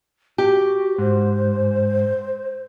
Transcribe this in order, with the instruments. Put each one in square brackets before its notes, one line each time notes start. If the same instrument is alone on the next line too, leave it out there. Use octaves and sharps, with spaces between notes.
[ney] F#4 [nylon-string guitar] G4
[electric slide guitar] G#2 [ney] C5